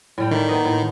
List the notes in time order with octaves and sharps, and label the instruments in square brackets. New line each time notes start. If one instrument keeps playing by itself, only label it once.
[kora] A2 G3 G5
[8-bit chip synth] D#3 [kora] A3 D4
[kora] A#3 B3 D#5
A2